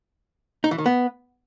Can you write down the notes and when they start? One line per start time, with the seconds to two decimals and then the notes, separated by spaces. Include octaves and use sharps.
0.64 D#4
0.71 E3
0.78 D#3
0.86 B3